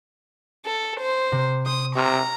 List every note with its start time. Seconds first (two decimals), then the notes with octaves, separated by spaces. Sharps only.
0.65 A4
1.00 C5
1.32 C3
1.66 C5 D#6
1.96 C3 A#5 C#6 E6 F6